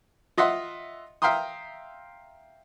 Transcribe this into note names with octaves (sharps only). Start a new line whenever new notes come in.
F4 D#5 E5 F#5 C6
E5 F5 G5 A#5 C6 D#6